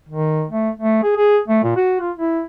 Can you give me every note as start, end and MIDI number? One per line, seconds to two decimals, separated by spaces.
0.09 0.45 51
0.50 0.70 57
0.80 1.01 57
1.03 1.13 68
1.16 1.38 68
1.48 1.61 57
1.63 1.72 46
1.76 1.97 66
2.00 2.11 65
2.17 2.42 64